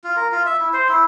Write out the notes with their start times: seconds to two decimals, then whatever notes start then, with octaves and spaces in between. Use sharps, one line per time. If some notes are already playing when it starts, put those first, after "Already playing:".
0.04 F4
0.16 A#4
0.32 F4
0.46 E5
0.60 E4
0.73 C5
0.89 E4